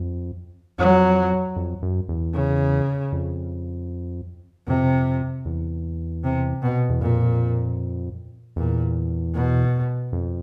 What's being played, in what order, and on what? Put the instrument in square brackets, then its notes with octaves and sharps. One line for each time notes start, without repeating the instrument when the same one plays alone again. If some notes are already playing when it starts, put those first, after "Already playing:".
Already playing: [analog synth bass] F2
[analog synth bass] F2 [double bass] F#3
[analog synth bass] F2
F#2
E2
[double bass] C#3
[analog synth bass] F2
[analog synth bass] F2 [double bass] C3
[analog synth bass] E2
[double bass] C3
B2
[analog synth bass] E2
[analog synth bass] F2 [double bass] A#2
[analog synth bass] E2 [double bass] A#2
[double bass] B2
[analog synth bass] F2